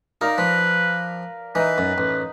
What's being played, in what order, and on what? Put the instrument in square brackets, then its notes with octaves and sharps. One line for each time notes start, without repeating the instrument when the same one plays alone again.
[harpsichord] D#4 [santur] A#4 D5 F5
[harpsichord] F3 [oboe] B4
[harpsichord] E3 [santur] D#4 [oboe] B4
[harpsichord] F#2
A1